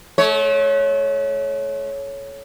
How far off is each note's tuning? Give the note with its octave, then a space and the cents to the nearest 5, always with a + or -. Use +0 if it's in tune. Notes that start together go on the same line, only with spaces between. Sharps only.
A3 -40 C#5 +0